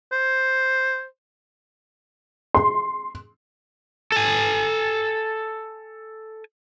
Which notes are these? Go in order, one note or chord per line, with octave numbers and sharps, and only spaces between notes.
C5
C6
A4 G#5